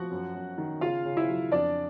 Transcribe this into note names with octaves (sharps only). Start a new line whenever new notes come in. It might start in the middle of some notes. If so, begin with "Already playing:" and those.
Already playing: F3 F#4 F#5
F#2
F#2
D#3
C#3 F4 F5
C#3
E4 E5
F#3
F2 D4 D5